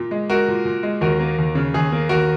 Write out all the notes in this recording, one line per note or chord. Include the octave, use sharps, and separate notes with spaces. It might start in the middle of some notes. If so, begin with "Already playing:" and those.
Already playing: A#2
G#3
G#3 F#4 A#4
A#2
A#2
G#3
D#2 F#4 A#4
A#3
D#2
C#3
D#2 G#4
A#3
D#2 F#4 A#4